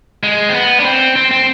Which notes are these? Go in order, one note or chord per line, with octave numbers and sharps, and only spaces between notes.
G#3
C4
B3
D4
C4
C4
C4